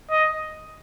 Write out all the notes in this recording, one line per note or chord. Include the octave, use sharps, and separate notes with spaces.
D#5